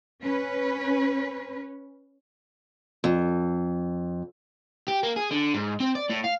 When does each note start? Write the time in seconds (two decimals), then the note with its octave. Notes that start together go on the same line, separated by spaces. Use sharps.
0.23 C#4 B4
3.04 F2
4.88 G4
5.03 A#3
5.16 G#4
5.31 D3
5.54 G#2
5.80 C4
5.95 D5
6.09 A2
6.24 F5